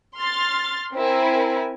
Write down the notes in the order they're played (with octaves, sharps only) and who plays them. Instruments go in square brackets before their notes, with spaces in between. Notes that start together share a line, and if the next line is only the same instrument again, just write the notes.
[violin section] C6 F6 A6
C4 E4 A#4 G#5